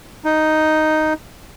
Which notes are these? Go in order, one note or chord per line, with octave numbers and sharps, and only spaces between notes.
D#4